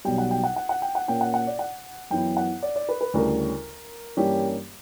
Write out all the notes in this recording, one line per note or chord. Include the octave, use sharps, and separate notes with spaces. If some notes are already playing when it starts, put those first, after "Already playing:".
B1 B2 G3 G5
F#5
G5
F#5
F#5
F#5
G5
F#5
A#2 A#3 C#4 G5
F#5
F#5
D5
F#5
F#2 E3 B3 E4 G5
F#5
D5
D5
B4
B4
D2 C#3 G3 C#4 E4 A#4
G2 E3 G3 A#3 C#4 G4